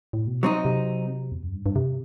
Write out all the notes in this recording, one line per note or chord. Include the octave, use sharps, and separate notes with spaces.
A2
B2
F#3 C4 D#4
C3
E2
F#2
G2
G2
C3